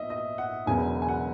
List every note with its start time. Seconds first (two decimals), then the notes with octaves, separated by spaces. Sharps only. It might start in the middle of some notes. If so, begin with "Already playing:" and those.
Already playing: A#1 A#2 B3 D#5 E5
0.10 D#5
0.38 F#5
0.66 E1 E2 C#3 F#3 B3 G#5
1.02 G#5
1.09 F#5